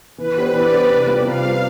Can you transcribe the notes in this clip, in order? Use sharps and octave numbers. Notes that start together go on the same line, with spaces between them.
E3 B4
B3 D4 G4 C5
E3 D5
B3 D4 G4 C5
C3
G3 C4 F4 B4
C3 F5
G3 C4 F4 B4